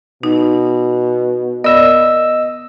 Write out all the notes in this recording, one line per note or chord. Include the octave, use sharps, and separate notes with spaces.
B2 D#4
B3 A#4 D5 D#5 E6